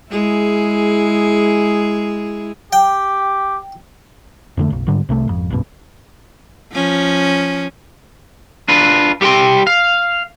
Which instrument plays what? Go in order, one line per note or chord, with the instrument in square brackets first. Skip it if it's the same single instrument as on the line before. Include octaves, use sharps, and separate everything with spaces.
[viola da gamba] G#3 E4 G#4
[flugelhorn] G4 [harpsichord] G5
[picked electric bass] F2 D3 A3
F#1 B1
G1 G#2 D3 G3
C2 C3 D#3 A3
G#1 F2
F1 B1 G2 B2
[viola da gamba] F3 C#4
[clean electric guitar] D4 F4 B4
G3 G4 F#5 G5 C6
F5